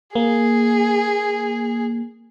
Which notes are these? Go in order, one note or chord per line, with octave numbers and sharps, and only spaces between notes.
A#3 G#4